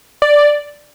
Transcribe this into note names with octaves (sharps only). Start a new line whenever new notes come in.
D5